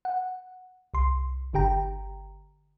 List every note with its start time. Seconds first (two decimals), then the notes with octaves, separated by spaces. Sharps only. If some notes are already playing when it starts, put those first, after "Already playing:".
0.05 F#5
0.94 C2 C6
1.53 G1 D3 G4 G5 A#5